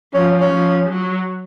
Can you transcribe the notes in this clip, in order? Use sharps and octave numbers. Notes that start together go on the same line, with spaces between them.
F3 C#4
C#4
F3
F#3